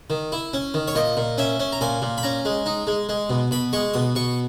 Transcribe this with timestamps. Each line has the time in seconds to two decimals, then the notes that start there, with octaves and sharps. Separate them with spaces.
0.10 D#3
0.32 E4
0.53 C#4
0.74 D#3
0.88 C#5
0.95 A#2 D#5
1.17 A#2
1.38 C#4 E5
1.60 C#4
1.72 A#5
1.81 A#2 G#5
2.02 A#2
2.18 B5
2.23 C#4 A#5
2.45 G#3
2.66 D#4
2.87 G#3
3.09 G#3
3.30 B2
3.51 B2 B5
3.73 G#3 C#6
3.94 B2 D#6
4.15 B2 C#6